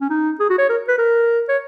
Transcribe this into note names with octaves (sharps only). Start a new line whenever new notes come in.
C#4
D#4
G#4
F#4
C#5
A#4
B4
A#4
C#5